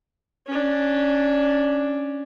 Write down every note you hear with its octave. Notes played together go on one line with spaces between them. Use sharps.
C#4 D4